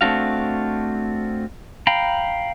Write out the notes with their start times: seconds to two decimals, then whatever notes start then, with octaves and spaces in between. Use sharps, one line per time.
0.01 A3 C4 D4 F#4 F5
1.87 F5 G5 A#5 B5